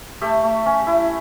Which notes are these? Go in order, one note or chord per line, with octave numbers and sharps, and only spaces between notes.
A3 G4 A4
A3
C#4
E4